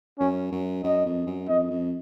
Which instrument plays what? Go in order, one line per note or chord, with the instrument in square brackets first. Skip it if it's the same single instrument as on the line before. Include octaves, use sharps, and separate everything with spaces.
[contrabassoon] F#2 [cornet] C#4
[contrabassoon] F#2
[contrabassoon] F#2 [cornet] D#5
[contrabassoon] F2
F#2
[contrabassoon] F2 [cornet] D#5
[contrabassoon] F2